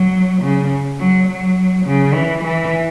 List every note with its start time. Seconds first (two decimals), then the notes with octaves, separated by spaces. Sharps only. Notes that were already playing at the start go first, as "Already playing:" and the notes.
Already playing: F#3
0.42 C#3
0.99 F#3
1.28 F#3
1.86 C#3
2.14 E3
2.43 E3